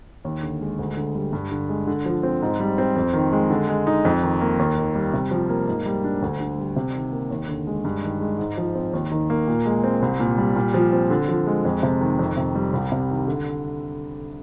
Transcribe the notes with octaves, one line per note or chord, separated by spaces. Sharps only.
D#2
D3
G#3
D2
D3
G3
G2
D3
G#3
D3
F3
C4
G#2
G3
C4
F2
D#3
G#3
D3
G#3
D#4
F2
D#3
A#3
D#2
D#3
G3
C3
F3
A#3
G#2
G3
D4
D2
D3
G3
C3
D#3
A#3
D#2
D3
G#3
G2
D#3
G#3
G#2
F3
C4
D#2
D#3
A#3
A#2
G#3
C4
C2
A#2
G3
A#2
F3
C4
D3
F3
G#3
F2
C3
D#3
F2
C3
G3
C2
C3
D#3
D3